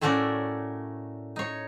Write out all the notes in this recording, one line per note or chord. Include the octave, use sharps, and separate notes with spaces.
A2 A3 C#4 F#4 A#4 D5
D#4 C#5